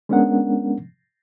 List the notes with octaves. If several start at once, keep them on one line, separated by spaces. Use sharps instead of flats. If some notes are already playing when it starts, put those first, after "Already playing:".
G#3 B3 C#4 D4 A#4 F#5